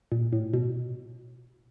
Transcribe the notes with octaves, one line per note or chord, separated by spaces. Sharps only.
A#2
A2
B2